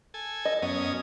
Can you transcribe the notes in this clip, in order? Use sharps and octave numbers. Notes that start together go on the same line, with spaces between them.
A4 G#5
D#5
F#2 B3 C#4 D#6